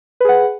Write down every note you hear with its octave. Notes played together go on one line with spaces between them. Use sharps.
G#4 B4 F#5